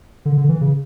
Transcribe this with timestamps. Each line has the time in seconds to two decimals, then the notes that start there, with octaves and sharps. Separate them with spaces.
0.25 D3
0.37 D3
0.49 E3
0.61 C#3